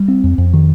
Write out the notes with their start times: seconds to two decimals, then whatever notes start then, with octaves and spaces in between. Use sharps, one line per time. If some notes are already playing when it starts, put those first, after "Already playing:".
Already playing: G3
0.08 C4
0.24 F2
0.38 F2
0.54 D#3